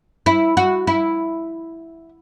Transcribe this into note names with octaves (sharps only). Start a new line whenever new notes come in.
E4
F#4
E4